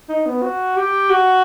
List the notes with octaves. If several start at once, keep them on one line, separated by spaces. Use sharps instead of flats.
D#4
B3
F#4
G4
F#4